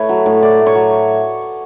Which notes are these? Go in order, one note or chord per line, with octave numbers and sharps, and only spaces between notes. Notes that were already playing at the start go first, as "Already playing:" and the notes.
Already playing: A2 A3 B4 C#5
F#3
A2
A2 D5
A3
C#5
F#3